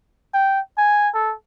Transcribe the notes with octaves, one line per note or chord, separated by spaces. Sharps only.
G5
G#5
A4